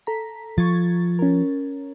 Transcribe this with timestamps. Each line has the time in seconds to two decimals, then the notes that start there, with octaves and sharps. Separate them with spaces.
0.07 A4 A#5 B6
0.58 F3 C#6 G#6 A6
1.19 C#4 A#4